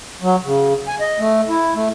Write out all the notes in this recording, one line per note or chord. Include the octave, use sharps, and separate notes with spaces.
F#3
C#3
G#5
D#5
A3
E4
A3